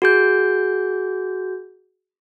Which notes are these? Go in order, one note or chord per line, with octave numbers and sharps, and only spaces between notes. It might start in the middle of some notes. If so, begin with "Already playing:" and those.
F#4 G#4 G6